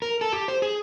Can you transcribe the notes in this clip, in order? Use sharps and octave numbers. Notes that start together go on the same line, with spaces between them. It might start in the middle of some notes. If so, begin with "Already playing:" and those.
A#4
A4
G4
C5
G#4